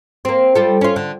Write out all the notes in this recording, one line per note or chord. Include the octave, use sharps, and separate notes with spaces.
A#3 C4
G3 F4 A4
C#4 F4
D3